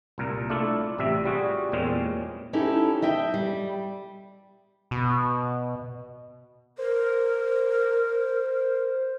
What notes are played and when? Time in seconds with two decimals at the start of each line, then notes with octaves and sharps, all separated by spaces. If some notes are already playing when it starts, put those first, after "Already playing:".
0.18 C2 A#2 A#4
0.50 A3 D4 E4 F4 A4
0.98 A1 C3 G3 E5
1.25 G3 F4 F#4 G#4
1.72 E2 A#2 G3 G#3 C4 C#4
2.53 C#4 D#4 E4 G4 A4
3.02 D#5 E5 G5
3.34 G3
4.91 B2
6.78 A#4 C5